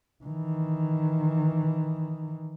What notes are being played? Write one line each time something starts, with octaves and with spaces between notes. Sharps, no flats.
D#3 E3